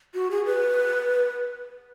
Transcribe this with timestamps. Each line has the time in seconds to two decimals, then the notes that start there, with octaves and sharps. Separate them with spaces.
0.14 F#4
0.31 G#4
0.45 B4